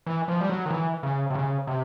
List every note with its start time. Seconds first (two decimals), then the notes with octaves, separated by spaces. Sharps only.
0.06 E3
0.28 F3
0.41 G3
0.50 F#3
0.66 D#3
0.71 E3
1.03 C#3
1.30 C3
1.35 C#3
1.67 C3